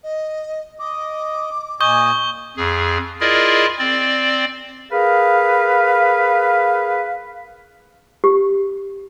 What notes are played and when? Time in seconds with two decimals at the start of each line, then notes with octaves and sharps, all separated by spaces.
0.03 D#5
0.79 D#5 D6
1.81 A#2 D#5 G#5 C#6 D#6 G6 G7
2.57 F2 G#4
3.21 E4 F4 G#4 A#4 D5 D#5
3.79 C4 D5
4.92 G#4 A#4 B4 F5
8.24 G4